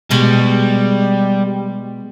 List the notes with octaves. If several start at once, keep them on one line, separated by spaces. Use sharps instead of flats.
B2 G3 G#3 G4